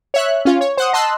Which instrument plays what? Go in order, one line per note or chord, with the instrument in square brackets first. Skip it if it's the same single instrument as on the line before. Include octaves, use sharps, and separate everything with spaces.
[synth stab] C#5 E5 F#6
C#4 F4
C#5
C5 F#5 D#6
D#5 A5 C6 E6 F#6